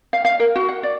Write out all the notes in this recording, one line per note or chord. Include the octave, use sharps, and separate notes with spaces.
F5
F5
A#4
F#4
F#5
D5